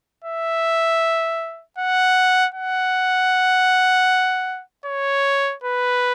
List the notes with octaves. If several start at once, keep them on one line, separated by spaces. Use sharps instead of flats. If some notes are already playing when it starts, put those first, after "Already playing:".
E5
F#5
F#5
C#5
B4